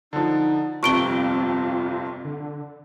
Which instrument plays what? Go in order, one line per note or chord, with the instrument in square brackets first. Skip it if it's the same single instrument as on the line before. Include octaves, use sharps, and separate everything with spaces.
[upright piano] D3 F3 [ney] D#4
[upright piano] G1 F2 C3 [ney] C4 [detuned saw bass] F4 [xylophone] C#6 D7 G7
[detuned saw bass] D3